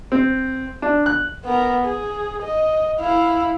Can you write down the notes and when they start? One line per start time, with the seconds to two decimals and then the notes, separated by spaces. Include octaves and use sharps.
0.12 C4
0.82 D4
1.06 F#6
1.45 B3 A#4
1.85 G#4
2.42 D#5
3.00 E4 F5